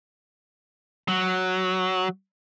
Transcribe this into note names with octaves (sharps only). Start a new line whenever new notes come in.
F#3